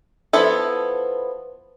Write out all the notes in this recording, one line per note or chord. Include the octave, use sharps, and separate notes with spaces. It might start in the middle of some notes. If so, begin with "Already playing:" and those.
F3 B3 E4 A4